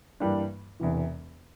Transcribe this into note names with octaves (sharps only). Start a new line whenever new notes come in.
G2 E3 G3 A#3 D4
E1 E2 C3 E3